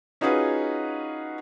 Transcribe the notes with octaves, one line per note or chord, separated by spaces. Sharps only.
C#4 D#4 F4 F#4 G#4 B4